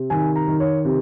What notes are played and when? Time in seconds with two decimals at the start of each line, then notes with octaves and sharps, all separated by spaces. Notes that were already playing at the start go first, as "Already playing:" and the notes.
Already playing: C3
0.10 D#3 G#5
0.36 A#5
0.48 D#3
0.60 C#5
0.85 C3